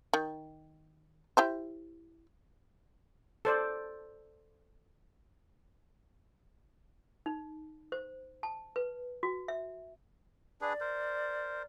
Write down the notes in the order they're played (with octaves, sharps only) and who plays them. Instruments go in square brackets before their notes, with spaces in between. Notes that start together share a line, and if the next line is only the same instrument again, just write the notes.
[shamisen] D#3
E4 G4 C5
[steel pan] A4 C5 D5
[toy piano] D#4
C5
A5
B4
F#4
E5
[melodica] D4 G#4 B4 [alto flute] D5
[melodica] A#4 C5